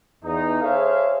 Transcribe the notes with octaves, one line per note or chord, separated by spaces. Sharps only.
E2 D#4
G#4 A4 C5 C#5 E5 F5